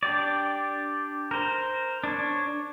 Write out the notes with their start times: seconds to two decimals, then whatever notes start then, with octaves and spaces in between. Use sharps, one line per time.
0.03 D4 G4 D5
1.31 A#4 C5
2.04 D4 C#5